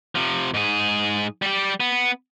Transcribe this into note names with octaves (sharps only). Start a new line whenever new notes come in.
C3 F3
G#2 G#4
G3 G4
B3